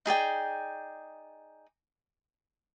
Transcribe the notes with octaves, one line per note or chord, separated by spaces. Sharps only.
D#4 G#4 D5 G5